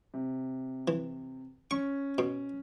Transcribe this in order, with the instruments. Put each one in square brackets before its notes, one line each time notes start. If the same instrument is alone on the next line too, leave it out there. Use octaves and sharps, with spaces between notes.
[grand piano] C3
[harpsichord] E3
[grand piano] C#4 [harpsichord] C#6
[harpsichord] B2